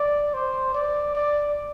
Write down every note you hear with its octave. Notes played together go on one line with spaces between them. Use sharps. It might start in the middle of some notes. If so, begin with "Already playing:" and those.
Already playing: D5
C5
D5
D5